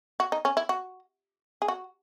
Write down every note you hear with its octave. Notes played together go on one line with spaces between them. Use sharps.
F#4
D#4
C#4
E4
F#4
G#4
F#4